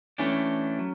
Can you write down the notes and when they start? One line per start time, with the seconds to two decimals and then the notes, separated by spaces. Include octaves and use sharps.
0.18 E3 A3 C#4 D4 G4
0.79 F#3